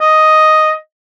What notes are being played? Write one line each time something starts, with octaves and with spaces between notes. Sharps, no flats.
D#5